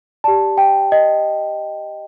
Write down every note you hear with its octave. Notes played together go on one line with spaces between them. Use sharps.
G4 D5 A5
G5
D#5